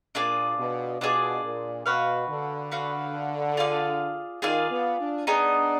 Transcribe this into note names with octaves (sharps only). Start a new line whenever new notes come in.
A#2 D4 F4 G#4 D5
B2
B2 D4 F4 G#4 D5
A#2
B2 F#4 B4 F5
D3
F#4 B4 F5
F4 G#4 D5 F5
D#3 F4 G#4 D5 F5
B3
D4
B3 D4 D#4 G#4 D#5